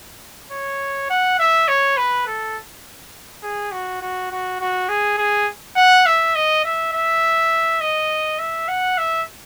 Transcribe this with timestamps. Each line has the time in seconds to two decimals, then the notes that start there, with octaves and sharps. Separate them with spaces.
0.52 C#5
1.10 F#5
1.39 E5
1.68 C#5
1.97 B4
2.27 A4
3.43 G#4
3.72 F#4
4.01 F#4
4.31 F#4
4.61 F#4
4.89 G#4
5.18 G#4
5.76 F#5
6.06 E5
6.36 D#5
6.65 E5
6.93 E5
7.81 D#5
8.39 E5
8.68 F#5
8.98 E5